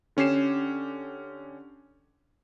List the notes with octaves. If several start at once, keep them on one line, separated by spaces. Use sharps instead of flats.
D3 C#4 G4 C7 E7